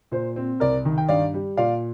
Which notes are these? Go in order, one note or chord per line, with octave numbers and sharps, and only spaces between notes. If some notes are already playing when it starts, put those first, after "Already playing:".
A#2 C5
C4
C2 A#4 D5
D#3
G5
G2 D5 F5
G3
A#2 D5 F5